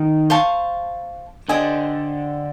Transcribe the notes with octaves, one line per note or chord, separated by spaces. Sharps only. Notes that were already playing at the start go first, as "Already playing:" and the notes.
Already playing: D#3
C5 F5 A5 C#6
D3 G4 C5 D#5 G#5